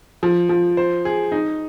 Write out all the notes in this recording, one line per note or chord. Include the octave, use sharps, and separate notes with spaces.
F3
F3
C5
G#4
D#4